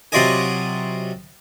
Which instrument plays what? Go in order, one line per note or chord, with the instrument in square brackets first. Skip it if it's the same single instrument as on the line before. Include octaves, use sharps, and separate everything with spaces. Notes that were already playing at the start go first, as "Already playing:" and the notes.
[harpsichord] C3 F#3 F4 D5 D#5 G#5